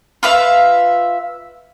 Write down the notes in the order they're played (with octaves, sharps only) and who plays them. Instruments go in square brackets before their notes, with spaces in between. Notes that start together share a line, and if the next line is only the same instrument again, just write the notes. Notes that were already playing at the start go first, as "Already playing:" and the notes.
[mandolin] F4 B4 E5 F5